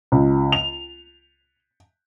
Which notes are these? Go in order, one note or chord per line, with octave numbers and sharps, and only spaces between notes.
C#2
F7